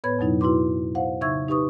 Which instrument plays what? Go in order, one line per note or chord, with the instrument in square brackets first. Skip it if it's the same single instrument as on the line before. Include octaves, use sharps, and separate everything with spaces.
[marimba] A2 B3 B4 C#5 B5 G#6
F2 B2 F#3 D#4 E4
E4 F#4 B4 C6 D6
C5 F5 F#5
C#3 D#4 E5 C#6 E6 G#6
D#4 G4 B4 C#6 D#6